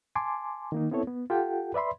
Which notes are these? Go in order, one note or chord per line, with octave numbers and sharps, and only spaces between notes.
G#5 A5 C6 D6
D#3 A#3 D#4
B3 C4 E4 A4 C#5
B3
F4 G4 A4 F#5 G5
B4 D5 E5 B5 C6